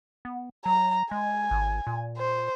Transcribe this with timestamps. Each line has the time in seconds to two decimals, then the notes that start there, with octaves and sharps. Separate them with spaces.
0.25 B3
0.66 F#3 A#5
1.11 G#3 G#5
1.51 G#1
1.87 A#2
2.17 C5